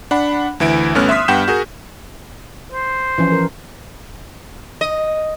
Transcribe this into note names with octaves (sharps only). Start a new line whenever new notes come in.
D4 F#5 B5
D2 E3 E4 D7
G1 A3 B3 C#4 F6 F#6
E5 C6 D#6 B6
G2 B3 F#5 G5 G6 E7
F#4 G#4 A#4
C5
E3 F3 C#4
A#4
D#5